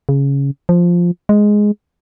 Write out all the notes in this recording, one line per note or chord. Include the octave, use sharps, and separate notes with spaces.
C#3
F3
G#3